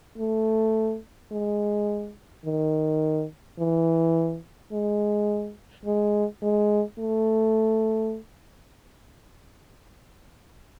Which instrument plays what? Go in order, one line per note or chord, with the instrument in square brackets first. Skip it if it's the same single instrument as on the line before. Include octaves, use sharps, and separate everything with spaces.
[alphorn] A3
G#3
D#3
E3
G#3
G#3
G#3
A3